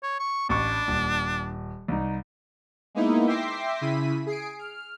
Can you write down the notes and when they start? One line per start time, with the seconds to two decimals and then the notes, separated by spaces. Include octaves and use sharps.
0.03 C#5
0.20 C#6
0.49 A1 D4 C#6
0.88 D#1
1.88 C2 D#4
2.95 G#3 A#3 B3 D#4 E4
3.27 E5 G5 C6 D6 A#6 C7
3.81 C#3 E4 B6 D#7
4.26 G#4 C7 D7
4.59 F6